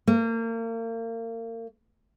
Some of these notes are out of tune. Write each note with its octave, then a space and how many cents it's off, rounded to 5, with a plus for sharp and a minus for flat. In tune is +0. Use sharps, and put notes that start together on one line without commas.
A#3 -35